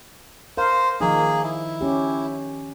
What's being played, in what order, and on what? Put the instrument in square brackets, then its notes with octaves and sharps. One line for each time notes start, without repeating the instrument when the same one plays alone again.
[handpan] A#4 F5 [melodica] C5
[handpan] D#3 F3 D#4 [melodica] A#3 G#4
[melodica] E4
[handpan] C#4 G4